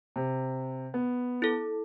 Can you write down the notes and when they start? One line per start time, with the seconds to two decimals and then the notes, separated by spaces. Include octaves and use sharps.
0.16 C3
0.94 B3
1.42 E4 A4